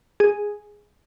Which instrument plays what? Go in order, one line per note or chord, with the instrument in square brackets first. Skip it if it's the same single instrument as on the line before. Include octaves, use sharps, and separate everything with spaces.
[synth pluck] G#4